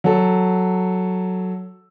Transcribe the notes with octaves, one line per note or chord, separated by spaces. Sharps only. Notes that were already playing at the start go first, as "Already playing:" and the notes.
F#3 A4